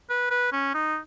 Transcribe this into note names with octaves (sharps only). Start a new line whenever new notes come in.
B4
B4
C#4
D#4